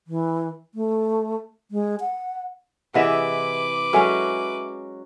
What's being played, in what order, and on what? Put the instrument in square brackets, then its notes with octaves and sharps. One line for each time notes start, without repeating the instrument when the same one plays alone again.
[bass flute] E3
A3
G#3
F#5
[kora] C3 E3 E5 [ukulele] G#4 D#5 F#5 [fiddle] B4 D6
[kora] F#3 G#3 C#4 [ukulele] A4 E5 G#5